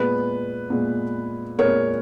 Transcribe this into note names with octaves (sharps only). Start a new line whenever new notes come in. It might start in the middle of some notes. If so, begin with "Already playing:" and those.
Already playing: A#2 G#3 B3 B4
A#2 G#3 B3
A#2 G#3 B3 A#4 C#5